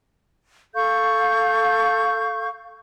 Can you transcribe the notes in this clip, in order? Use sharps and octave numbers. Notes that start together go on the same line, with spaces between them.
A4 F5 C#6 G6